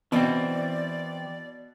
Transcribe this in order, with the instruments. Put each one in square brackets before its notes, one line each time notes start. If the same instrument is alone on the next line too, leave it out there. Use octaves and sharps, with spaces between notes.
[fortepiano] B2 [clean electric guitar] E3 C4 [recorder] D5